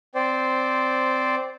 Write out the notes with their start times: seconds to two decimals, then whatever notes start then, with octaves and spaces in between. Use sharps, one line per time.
0.15 C4 C5 D5